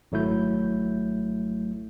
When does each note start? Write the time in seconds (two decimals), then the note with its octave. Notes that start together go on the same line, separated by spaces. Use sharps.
0.12 G#1 F#3 A3 E4 G6